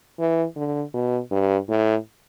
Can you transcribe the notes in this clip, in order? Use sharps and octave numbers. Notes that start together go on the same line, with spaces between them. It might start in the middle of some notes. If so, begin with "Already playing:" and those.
E3
D3
B2
G2
A2